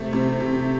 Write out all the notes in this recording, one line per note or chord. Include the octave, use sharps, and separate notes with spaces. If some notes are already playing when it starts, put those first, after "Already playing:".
Already playing: C3 A3
C3
C3